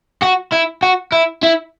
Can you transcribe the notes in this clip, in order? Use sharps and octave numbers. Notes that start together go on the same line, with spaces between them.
F#4
E4
F#4
E4
E4